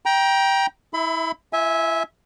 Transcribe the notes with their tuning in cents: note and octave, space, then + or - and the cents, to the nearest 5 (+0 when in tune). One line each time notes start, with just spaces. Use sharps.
G5 +0 A#5 +30
E4 -25 E5 +0 B5 +30
E4 +45 E5 -15 G#5 +0